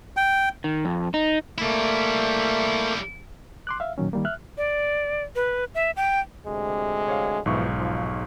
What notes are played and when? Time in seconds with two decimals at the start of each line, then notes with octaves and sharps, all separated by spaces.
0.17 G5
0.64 D#3
0.85 F2
1.14 D#4
1.58 G3 A3 A#3 E4
3.67 C6 D6 F#6
3.80 E5 F5
3.98 A#2 D#3 F#3 C#4
4.13 D#3 G3 A#3
4.25 E5 F6 F#6
4.57 D5
5.36 B4
5.75 E5
5.97 G5
6.46 D2 C3 G#3
7.08 C#5 F5
7.46 B1 G#2 E3 F3 E4 C#6
7.78 F3